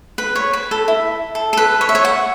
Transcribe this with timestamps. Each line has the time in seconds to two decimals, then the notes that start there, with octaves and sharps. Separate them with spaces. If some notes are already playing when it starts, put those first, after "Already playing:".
0.18 B4
0.36 C#5
0.53 B4
0.71 A4
0.88 E4
1.35 A4
1.53 A4
1.57 B4
1.81 C#5
1.89 E5
1.95 C#5
2.05 F#5